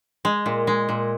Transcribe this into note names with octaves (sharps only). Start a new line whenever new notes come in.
G#3
A#2
G#3
A#2